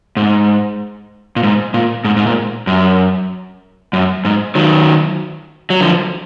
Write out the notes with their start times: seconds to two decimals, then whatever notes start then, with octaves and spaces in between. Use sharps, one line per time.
0.17 G#2
1.36 A#2
1.43 G#2
1.74 A#2
2.04 G#2
2.16 G#2
2.27 A#2
2.67 F#2
3.93 F#2
4.25 G#2
4.55 D#3 F#3
5.70 F#3
5.81 D3 F3